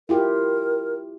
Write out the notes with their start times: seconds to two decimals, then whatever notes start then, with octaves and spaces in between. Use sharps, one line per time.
0.09 E4 F4 G4 A#4